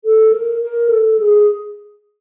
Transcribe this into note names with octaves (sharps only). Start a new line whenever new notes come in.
A4
A#4
A#4
A4
G#4